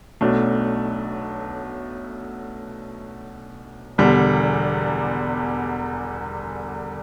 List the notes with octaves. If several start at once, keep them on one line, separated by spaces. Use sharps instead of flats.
B1 B2 F#3 A3 D4
E1 E2 D3 G3